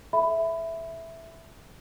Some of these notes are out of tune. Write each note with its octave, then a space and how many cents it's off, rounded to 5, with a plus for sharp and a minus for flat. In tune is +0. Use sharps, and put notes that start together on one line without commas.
A4 -35 E5 +0 B5 +20